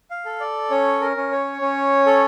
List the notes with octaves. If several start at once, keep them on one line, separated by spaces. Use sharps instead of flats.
F5
A4
D5
C#4 C#5
A#4
C#4
C#5
C#4
A4